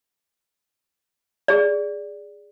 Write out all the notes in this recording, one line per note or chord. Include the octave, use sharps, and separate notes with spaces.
G#4 D5